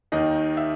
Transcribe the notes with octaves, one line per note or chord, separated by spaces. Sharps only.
D#2 D#3 D#5
E5